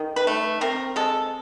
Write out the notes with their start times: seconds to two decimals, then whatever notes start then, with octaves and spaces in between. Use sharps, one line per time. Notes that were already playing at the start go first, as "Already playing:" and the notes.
Already playing: D#3
0.16 B4
0.27 A3
0.61 C4 A#4
0.96 G#3 A4